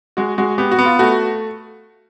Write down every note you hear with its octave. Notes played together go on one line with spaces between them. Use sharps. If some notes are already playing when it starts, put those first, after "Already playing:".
G#3 F#4
G#3 F#4
B3 G4
F#4
B3
F4
A3 F#4